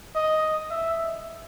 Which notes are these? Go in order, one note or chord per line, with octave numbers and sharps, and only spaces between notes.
D#5
E5